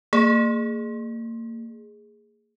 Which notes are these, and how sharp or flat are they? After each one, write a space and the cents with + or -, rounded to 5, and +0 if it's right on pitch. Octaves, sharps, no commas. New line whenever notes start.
A#3 -30 G#4 +0